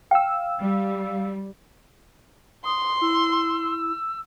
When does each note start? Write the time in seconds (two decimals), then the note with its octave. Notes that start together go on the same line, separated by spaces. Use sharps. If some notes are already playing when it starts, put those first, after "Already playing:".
0.11 F5 G5 E6
0.59 G3
2.65 C6 D#6
3.01 E4 E6